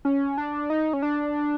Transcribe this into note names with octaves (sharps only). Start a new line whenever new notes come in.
C#4
D4
D#4
C#4
D4